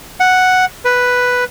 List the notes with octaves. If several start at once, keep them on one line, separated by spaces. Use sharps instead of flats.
F#5
B4